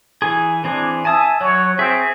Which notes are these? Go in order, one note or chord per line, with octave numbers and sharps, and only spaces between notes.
E3 G#4
E3 C4 D4 G#4
E5 G#5 A5 D#6
F#3 C#5
C4 G#4 E5